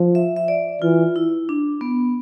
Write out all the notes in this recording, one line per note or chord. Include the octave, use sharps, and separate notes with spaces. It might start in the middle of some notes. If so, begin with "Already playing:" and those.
Already playing: F3
E5
E5
D5
E3 F4
E4
D4
B3